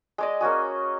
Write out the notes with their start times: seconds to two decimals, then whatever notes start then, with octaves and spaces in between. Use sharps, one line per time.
0.18 G#3 D5 D#5
0.41 A#3 C#4 F#4 G#4